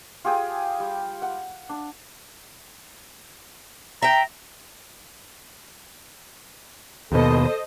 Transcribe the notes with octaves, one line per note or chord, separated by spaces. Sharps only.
F4 G4 G#4 G5
G3
F#5
D4
E5 G5 A#5
D#2 B2 A4 C5 D#5